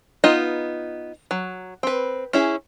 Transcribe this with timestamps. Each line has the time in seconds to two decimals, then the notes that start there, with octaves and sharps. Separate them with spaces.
0.24 B3 D#4 F4 D#5
1.31 F#3
1.83 C4 B4
2.33 C#4 E4 G#4